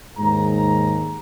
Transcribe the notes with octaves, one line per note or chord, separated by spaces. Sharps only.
D#2 G#2 G#4 A#5